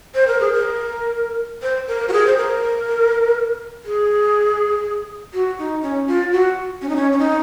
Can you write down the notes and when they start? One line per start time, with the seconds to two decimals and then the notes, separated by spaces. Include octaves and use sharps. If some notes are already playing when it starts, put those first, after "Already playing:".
0.15 C5
0.27 A#4
0.41 G#4
0.54 A#4
1.63 C5
1.88 A#4
2.08 F#4
2.13 G#4
2.27 C5
2.38 A#4
3.85 G#4
5.34 F#4
5.59 D#4
5.83 C#4
6.08 F4
6.32 F#4
6.82 C#4
6.89 D#4
6.96 C#4
7.12 C#4
7.19 D#4